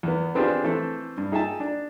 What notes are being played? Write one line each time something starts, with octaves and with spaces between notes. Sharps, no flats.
E2 B3
B3 C4 D4 F4 G4 G#4
E3 A3 C4 A4
G2
D#4 G#4 E5 G5 A5
D4